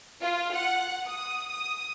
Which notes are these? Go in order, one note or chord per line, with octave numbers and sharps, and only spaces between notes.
F4
F#5
D#6
D#6